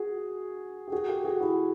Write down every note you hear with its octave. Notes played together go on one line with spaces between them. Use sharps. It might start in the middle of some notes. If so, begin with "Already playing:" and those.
Already playing: F#4 G#4
G4
F#4 G#4
G4 A4
F#4 G#4
E4 F#4